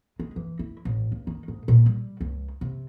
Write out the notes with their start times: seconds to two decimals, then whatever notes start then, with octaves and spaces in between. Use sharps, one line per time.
0.19 G#3
0.36 E3
0.59 E4
0.85 A1
1.12 C#2
1.27 D#3
1.48 G#2
1.68 A#2
1.86 G3
2.21 C#2
2.61 C3